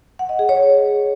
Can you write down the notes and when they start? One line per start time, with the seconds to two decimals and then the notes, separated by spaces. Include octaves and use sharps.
0.19 F#5
0.29 D#5
0.39 G#4
0.49 C#5